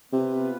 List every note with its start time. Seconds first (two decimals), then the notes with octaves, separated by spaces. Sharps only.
0.13 C3 B3 F4 B4